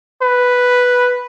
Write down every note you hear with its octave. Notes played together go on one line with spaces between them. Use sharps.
B4